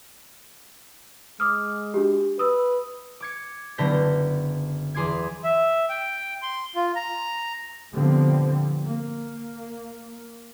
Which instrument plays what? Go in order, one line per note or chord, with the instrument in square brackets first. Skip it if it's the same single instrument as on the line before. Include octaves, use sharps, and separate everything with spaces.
[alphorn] G#3 [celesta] D6 D#6 F6
[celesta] D4 F#4 G4
[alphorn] B4 [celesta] D#6 E6
[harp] D6 G#6 C#7
F#1 D3 B3 G6 A#6 B6
E2 G#4 C6 D6 G#6
[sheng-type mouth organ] E5
G5
C6
F4
A#5
[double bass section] A#2 D3 F3 G3 B3 C4
A#3